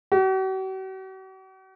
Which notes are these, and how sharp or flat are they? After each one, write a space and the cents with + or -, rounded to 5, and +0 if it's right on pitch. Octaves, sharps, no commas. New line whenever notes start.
F#4 +45